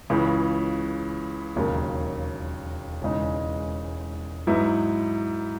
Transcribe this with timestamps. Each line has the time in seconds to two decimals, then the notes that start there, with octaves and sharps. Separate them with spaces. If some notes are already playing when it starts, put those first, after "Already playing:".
0.10 C#2 C#3 E3
1.56 E1 D#2 C#3 F#3 A#3
3.02 E1 E2 C#3 G#3 D#4
4.47 G#2 F#3 B3 E4